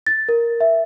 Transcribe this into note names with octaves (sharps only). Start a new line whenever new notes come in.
A6
A#4
E5